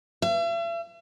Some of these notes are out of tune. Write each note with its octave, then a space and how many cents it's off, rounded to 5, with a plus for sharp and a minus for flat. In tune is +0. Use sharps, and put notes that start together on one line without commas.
E5 +45